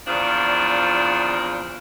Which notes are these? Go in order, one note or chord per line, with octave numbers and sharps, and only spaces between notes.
E2 A#2 C#3 F3 D4